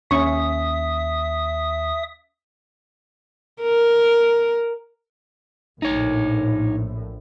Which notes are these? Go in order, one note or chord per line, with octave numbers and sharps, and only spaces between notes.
D#2 C#4 E5 C#6 D#6
A#4
A#1 A2 D#4 C#5